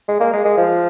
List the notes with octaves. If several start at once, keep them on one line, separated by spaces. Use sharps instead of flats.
G#3
A#3
G#3
G#3
F3